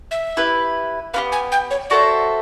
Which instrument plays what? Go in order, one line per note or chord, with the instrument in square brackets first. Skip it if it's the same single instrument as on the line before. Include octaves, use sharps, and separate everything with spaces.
[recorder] E5
[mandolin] E4 G4 B4
[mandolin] B3 E4 G4 [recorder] F5
[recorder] G#5
G5
C#5
[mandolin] F#4 A4 C5 E5 [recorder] D5